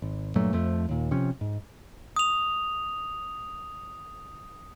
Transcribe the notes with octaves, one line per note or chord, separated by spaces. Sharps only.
G#1
G2 A#2 F#3 A3
F2 F3 A3
D#2 A#2
C3 F3 C#4
G#2
D#6 F7